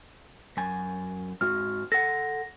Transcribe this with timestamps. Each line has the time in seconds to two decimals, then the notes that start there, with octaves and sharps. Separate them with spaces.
0.57 F#2 G#5
1.41 G#2 G#3 F#4 F6
1.92 A4 F#5 A#6